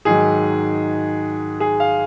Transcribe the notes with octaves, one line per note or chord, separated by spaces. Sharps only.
G#2 D#3 F#3 G#4
G#4
F5